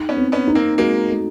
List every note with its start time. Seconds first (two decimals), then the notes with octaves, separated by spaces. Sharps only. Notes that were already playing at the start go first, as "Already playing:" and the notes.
Already playing: D#4
0.09 B3 C#4
0.17 C4
0.32 B3 C#4
0.48 D#4
0.55 A#3 C4
0.78 G#3 A#3 F#4
1.09 A3